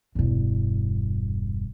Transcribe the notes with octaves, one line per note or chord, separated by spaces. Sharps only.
E1 G2